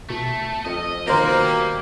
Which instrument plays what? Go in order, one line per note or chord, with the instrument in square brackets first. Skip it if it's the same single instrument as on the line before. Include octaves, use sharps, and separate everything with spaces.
[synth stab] B2 [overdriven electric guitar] A3
[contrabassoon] F2 [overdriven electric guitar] D#5
[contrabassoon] B2 [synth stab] D#3 C5 A#5 [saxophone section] A#3 [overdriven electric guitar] G4 D5